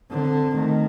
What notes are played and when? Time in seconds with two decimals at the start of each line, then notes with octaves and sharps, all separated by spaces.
0.10 D3 C4
0.54 D#3 A3